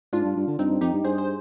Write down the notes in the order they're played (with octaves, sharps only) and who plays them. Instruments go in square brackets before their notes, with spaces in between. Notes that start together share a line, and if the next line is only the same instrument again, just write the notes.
[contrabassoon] G#2 [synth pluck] D4 F4
[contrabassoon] G2
G2
D3
[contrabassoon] G2 [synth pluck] C4 D#4
[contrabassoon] G2
[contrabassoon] F2 [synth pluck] D#4 G4
[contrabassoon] G2
[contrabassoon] G2 [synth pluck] G#4 C5
[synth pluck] C5